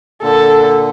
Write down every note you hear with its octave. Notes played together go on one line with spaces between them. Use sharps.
A#2 D3 A4